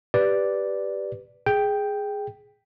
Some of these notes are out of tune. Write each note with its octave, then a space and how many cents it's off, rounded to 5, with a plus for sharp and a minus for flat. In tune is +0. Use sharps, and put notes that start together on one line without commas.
G4 +0 B4 +0 D5 +0
G#4 +0 G5 +0